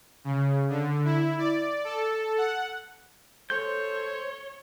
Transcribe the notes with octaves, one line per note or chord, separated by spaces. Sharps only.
C#3
D3
E4
D5
A4
F#5
A4 C5 C#5 G6